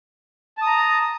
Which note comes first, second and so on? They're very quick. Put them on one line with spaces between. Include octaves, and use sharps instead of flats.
A5 D#6 A#5